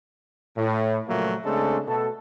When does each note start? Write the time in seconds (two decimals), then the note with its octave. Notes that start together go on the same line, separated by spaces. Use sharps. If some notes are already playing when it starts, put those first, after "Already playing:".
0.57 A2
1.08 A#2 C#3 F3 F#3 A3 A#3
1.45 C#3 G#3 A3 C4 D4 A4
1.88 B2 A3 F#4 A4